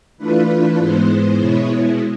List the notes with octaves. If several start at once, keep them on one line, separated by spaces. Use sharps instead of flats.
E3 A3 D4 F4 B4
G#2 E3 G#3 B3 C5
B2 G#3 B3 E4 C#5